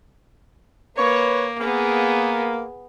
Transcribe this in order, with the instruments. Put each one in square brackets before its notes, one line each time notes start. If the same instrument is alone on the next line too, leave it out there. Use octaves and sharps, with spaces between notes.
[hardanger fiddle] A#3 [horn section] B4 C#5
[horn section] A#3 [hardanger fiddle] B3 G#4